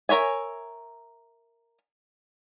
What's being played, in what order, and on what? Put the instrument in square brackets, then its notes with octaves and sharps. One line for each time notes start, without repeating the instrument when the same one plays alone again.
[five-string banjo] A#4 C#5 E5 G#5